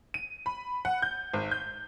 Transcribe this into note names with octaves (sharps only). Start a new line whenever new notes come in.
D#7
B5
F#5
G6
G#1
G6